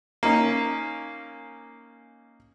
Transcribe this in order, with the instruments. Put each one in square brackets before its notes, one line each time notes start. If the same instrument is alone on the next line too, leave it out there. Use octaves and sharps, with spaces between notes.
[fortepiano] A#3 C#4 D#4